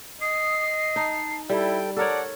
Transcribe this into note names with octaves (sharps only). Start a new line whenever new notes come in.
D#5 D#6 C7
D#4 A5
G3 E4 A4 G5
A4 A#4 C#5 D5 F#5 A5